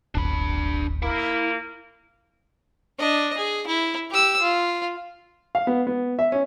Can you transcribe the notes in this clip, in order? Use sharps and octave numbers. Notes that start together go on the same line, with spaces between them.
D1 G1 D4 B5
A#3 E4
D4 D#5
G#4
E4
G4 E6
F4
F5
B3
B3
E5
C#4